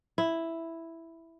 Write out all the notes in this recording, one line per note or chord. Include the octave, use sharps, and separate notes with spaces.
E4